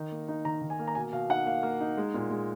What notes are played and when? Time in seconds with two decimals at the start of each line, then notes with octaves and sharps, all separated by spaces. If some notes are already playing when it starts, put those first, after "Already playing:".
Already playing: D#3 D#4
0.12 A#3
0.28 D#4
0.45 D#3 A#5
0.62 D#3
0.70 G#5
0.79 A#3
0.87 A#5
0.95 B2 G#5
1.12 B2 F5
1.29 D#4 F#5
1.46 A#3 F5
1.63 A#3
1.81 D#4
1.97 G#3
2.14 A#2
2.31 G#3